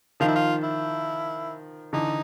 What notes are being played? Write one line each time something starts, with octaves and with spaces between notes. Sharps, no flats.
D#3 F3 F4
E4
F4
E4
D3 E3 D#4